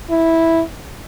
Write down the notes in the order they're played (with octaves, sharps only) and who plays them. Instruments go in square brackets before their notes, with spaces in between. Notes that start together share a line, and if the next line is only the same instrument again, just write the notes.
[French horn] E4